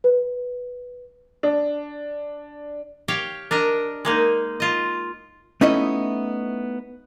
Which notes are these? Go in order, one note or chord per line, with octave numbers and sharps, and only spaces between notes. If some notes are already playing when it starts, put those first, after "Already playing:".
B4
D4
G4 C#5 F5 G5
D4 A#4 D#5
G#3 A#3 D#4
F4 D#5
A3 B3 C#4 D#4 E4 D#5